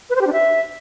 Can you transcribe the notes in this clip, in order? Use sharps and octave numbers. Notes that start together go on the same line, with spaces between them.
B4
C5
G4
D4
E5